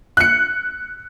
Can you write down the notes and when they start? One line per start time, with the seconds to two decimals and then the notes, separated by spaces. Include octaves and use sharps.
0.17 F#6 C#7